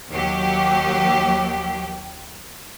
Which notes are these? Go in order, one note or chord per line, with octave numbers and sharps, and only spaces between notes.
D#2 F#3 G4